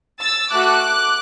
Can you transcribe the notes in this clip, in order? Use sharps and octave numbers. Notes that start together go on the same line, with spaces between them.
E6 A6
A3 F#4 A4 D6 F#6